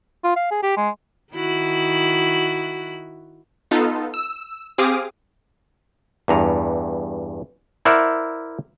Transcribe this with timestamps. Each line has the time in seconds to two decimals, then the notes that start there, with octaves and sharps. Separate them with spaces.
0.24 F4
0.36 F5
0.51 G#4
0.63 G4
0.77 G#3
1.33 D#3 E4 F#4
3.71 B3 D#4 F4 A4
4.14 E6
4.78 C4 G4 G#4 F5 D6 D#6
6.28 E2 G2 A#5
7.85 E4 A#4 C5 D5 E5 F#5